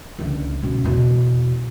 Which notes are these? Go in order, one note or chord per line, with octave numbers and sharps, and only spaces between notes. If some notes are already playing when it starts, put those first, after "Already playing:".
C#2 D3
B2 C#4
E2 B2